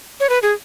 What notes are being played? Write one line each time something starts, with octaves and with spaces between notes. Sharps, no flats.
C#5
B4
G#4